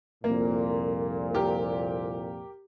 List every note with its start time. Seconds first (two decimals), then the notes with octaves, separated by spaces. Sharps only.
0.24 C2 F2 A#2 A#3
1.35 G4 A#4